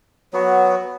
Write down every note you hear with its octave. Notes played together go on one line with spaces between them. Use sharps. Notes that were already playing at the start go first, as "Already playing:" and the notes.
F#3 B3 F#4